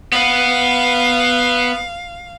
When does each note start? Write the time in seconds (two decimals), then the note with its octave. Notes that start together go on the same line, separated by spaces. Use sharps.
0.12 B3 F5